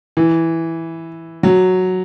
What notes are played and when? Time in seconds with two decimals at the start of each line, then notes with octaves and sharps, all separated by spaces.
0.17 E3
1.43 F#3